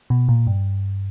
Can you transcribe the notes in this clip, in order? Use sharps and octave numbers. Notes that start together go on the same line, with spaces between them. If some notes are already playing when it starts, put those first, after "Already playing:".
B2
A#2
G2